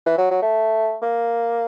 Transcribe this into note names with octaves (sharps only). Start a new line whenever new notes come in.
E3
F#3
F#3
A3
A#3